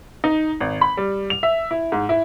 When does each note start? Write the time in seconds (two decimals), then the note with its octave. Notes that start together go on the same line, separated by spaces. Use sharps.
0.24 D#4
0.60 G#1
0.81 B5
0.97 G3
1.30 F7
1.43 E5
1.71 E4
1.92 G#2
2.09 E4